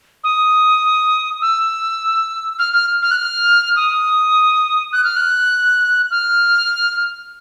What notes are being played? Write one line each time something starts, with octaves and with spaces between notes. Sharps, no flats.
D#6
E6
F6
F6
F6
F#6
F6
D#6
F#6
F6
F#6
F6